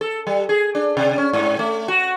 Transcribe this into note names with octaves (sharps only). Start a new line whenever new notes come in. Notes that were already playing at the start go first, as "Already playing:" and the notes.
A4
G3
G#4
D4
C3
C#4
G#2
A3
F#4